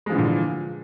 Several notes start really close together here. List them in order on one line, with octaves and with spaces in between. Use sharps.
G#3 F3 E3 D3 A#2